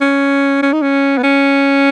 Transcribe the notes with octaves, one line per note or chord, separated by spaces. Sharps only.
C#4
C#4
D#4
C#4
B3
C#4